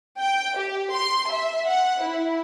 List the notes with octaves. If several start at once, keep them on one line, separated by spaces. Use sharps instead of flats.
G5
G4
C6
E5
F#5
E4